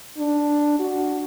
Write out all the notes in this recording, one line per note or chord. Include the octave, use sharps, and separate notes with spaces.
D4
F#4